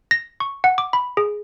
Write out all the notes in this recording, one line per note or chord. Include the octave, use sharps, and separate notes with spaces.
A#6
C#6
F#5
D6
B5
G#4